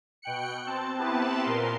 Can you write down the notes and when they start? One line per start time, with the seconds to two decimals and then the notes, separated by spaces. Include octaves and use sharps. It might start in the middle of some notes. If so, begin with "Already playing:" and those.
0.22 B2 G5 F#6 C#7
0.66 C4 A5
0.97 B3 C4 E4 G4 B4 A5
1.44 A#2 A#4 C6